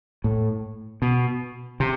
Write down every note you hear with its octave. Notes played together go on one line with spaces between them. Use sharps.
A2
B2
C3